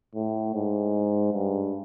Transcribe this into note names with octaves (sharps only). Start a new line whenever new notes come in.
A2
G#2
G2